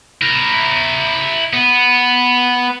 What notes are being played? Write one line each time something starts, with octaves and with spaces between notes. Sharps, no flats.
E4 A#4
B3